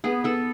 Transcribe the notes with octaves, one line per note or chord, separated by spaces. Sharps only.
B3 G#4
B3 A4